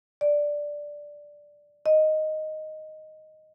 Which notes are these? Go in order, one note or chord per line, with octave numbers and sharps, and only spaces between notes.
D5
D#5